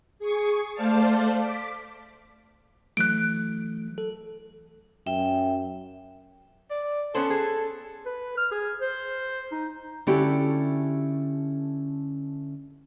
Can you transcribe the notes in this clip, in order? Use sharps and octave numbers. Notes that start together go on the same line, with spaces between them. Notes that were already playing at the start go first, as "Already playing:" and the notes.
G#4 C#6
A3 C5 D5 F5 A5
D6 B6
E3 F#3 A3 F#6 D7
A4
F#2 E5 G5
D5
B3 C#4 A4 C5
G#4
B4
F6
G#4
C5
D#4
D3 A3 C#4 E4 F#4 G4